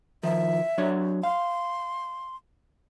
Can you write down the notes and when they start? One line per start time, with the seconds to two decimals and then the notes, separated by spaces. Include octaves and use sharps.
0.23 D#3 F3 E5
0.78 F#3 D4 C#5
1.23 F5 C6